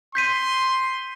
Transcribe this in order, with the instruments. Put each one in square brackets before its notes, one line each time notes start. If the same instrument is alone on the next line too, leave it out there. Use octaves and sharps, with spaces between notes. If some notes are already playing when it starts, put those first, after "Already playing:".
[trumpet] C6 [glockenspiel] G6 B6 D#7